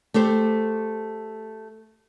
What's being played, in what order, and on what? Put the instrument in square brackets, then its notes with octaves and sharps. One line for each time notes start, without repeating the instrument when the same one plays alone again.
[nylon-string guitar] A3 G4 A4 C5